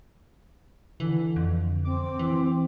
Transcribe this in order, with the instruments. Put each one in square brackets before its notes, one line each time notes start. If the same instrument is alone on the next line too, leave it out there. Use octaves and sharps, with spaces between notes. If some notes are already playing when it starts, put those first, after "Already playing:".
[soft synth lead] D3 [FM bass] E3
[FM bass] F2
[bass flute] C4 [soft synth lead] D6
[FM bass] E3